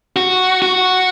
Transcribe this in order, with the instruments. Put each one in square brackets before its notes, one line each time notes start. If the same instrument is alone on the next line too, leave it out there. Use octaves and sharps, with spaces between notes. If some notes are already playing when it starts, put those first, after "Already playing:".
[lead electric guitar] F#4
F#4